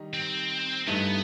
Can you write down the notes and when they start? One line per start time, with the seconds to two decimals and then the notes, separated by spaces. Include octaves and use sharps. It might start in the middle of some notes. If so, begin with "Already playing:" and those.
Already playing: D#3 G3 D#4
0.14 C4
0.87 G2 E3 A3 B3 D#4